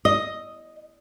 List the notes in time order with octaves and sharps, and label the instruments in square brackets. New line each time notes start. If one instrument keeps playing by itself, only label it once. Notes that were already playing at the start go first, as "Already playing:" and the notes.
[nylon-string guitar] D#5